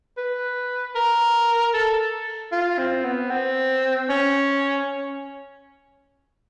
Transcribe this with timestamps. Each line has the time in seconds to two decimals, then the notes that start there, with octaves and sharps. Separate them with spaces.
0.17 B4
0.95 A#4
1.74 A4
2.52 F4
2.79 C4
3.04 B3
3.30 C4
4.09 C#4